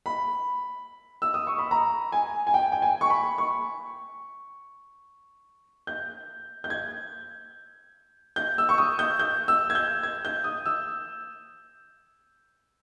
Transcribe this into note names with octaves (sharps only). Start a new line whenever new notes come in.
B5
E6
D#6
C#6
B5
A#5
G#5
G#5
G5
G5
G#5
C#6
B5
C#6
G6
G6
G#6
G6
E6
C#6
D#6
G6
G6
E6
G#6
G6
G#6
G6
D#6
E6